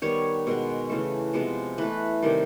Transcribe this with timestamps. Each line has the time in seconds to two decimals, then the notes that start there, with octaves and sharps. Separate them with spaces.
0.02 D#3 G3 B3 C#5
0.47 B2 G#3 B3
0.89 C#3 E3 A3
1.33 C3 F3 G#3 B3
1.78 E3 A3 B4
2.22 C3 D#3 G3